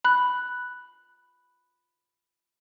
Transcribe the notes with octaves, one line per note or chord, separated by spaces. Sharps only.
B5 F#6